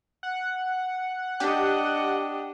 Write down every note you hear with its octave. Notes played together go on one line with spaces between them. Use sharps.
F#5
D4 G4 D#5